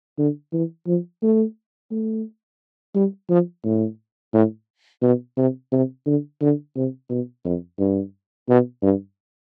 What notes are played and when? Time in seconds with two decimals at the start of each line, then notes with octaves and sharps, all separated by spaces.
0.18 D3
0.53 E3
0.87 F3
1.23 A3
1.91 A3
2.95 G3
3.29 F3
3.64 A2
4.33 A2
5.02 B2
5.37 C3
5.72 C3
6.06 D3
6.42 D3
6.76 C3
7.10 B2
7.45 F2
7.79 G2
8.49 B2
8.83 G2